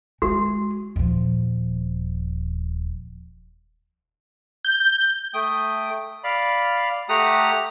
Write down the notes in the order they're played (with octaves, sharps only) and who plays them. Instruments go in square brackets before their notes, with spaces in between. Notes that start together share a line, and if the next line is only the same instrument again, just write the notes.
[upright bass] G#3 [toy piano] F#4
[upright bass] D#1 F3
[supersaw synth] G6
[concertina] A3 G5 D#6
D5 F5 B5
A3 G4 F#5 A#5 D#6